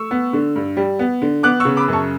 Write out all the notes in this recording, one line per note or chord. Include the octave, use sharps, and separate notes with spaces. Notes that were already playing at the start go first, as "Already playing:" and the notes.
Already playing: A3 C#6 E6
B3
D3
G2
G3
B3
D3
B3 D6 F#6
C#6 E6
C#3
B5 D6
F#2 A5 C#6